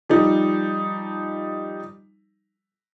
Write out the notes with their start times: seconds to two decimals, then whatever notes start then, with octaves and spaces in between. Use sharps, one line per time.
0.09 F3 G3 D#4